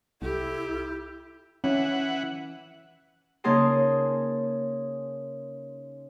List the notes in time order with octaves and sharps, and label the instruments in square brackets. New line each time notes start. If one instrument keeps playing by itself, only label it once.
[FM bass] C2 [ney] E4 [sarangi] G4 [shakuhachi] A4
[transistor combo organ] E3 F#5 [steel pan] C#4 E4
[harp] C#3 A#3 D#4 G#4 A5 C6